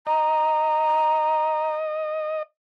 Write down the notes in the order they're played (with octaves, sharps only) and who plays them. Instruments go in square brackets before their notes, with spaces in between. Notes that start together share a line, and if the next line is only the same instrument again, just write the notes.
[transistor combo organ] D#5 [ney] A#5